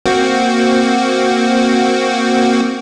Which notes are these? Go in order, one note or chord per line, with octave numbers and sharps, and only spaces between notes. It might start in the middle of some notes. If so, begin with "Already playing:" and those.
A#3 C4 F#4